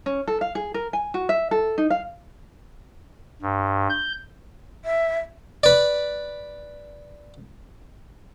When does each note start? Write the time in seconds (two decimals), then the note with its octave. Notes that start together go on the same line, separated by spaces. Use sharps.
0.06 C#4
0.28 A4
0.41 F5
0.55 G#4
0.74 A#4
0.93 G#5
1.14 F#4
1.29 E5
1.51 A4
1.78 D#4
1.90 F5
3.42 G2
3.89 G6
4.85 E5
5.63 B4 D5